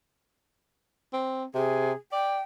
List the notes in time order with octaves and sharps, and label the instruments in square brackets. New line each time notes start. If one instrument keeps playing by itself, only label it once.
[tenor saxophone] C4
[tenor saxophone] C3 [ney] G#4
[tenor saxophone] D5 [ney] G5